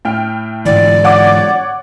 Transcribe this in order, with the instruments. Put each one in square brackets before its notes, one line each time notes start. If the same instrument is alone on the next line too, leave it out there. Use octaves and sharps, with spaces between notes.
[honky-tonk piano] A2 G5 F6
[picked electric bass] G#2 D3 E3 [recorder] D5
[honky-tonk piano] C#5 F#5 D6